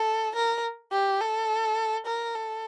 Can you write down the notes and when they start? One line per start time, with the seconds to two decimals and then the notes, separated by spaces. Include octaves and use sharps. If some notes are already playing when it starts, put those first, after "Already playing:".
Already playing: A4
0.35 A#4
0.92 G4
1.20 A4
2.06 A#4
2.35 A4